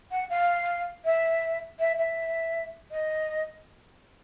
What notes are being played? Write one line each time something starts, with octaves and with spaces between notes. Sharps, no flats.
F#5
F5
E5
E5
E5
D#5